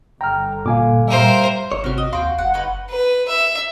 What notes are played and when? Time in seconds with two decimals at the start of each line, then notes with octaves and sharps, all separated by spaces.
0.21 G1 D3 G5 A#5 F6
0.66 A#2 F5 G#5 D6
1.08 G2 G3 A#4 C5 E5 F5
1.72 G1 C#5
1.84 G#1 C3 C4 C#4 F#4 F6
1.98 D#5
2.13 D#2 F#4 F5 G5 C6
2.38 F#1 F#5
2.54 C#4 D#4 B4
2.90 B4
3.28 E5